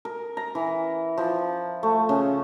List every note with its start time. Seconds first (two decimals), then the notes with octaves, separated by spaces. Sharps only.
0.05 A#4
0.37 A#5
0.55 E3
1.18 F3
1.83 A3
2.09 C#3